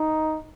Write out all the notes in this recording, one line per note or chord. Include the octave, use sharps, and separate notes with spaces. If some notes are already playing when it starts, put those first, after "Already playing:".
Already playing: D#4